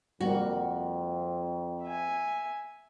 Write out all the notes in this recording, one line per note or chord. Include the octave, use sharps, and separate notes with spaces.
F2 G3 A#3 F#4
E5 G#5